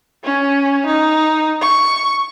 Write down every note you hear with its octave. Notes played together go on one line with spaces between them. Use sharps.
C#4
D#4
C#6